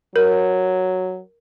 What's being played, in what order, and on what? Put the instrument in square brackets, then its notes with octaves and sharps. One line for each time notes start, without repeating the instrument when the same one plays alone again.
[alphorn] F#3 [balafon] A#4